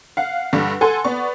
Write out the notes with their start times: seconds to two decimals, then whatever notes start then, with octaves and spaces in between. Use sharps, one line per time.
0.17 F5 F#5
0.53 G2 D3 G3
0.81 A4 F#5 G#5 C6
1.04 B3 D5 C#6